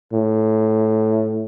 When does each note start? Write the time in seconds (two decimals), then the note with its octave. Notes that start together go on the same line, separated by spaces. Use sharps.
0.13 A2